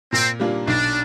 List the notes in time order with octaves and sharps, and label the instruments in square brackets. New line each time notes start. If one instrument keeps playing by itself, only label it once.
[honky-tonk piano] A#2 [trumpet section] C4
[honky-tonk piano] G3 A#3 D4 F4
[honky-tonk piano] B1 [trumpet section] D4